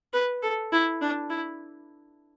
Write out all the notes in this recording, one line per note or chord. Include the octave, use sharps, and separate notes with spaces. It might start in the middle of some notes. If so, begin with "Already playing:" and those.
B4
A4
E4
D4
E4